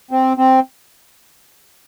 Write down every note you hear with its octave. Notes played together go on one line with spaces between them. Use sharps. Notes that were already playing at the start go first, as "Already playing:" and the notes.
C4
C4